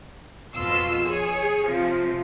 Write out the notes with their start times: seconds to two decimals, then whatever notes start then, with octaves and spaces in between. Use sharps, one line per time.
0.54 F2 B2 F4 C6 E6 C7
1.05 G#4 C#5
1.66 C3 F3